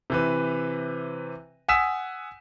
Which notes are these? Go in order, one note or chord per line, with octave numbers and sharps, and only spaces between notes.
C3 E3 B4
F#5 G#5 D#6 E6 B6 E7